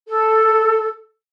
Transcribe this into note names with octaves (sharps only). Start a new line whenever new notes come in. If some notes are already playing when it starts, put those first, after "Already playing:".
A4